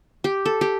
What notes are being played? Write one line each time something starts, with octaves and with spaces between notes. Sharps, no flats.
G4
A4
G4